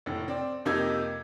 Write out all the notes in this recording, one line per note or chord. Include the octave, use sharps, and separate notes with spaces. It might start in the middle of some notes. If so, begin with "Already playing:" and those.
F1 A2
C4 D5
F2 C3 A#3 D#4 E6 G#6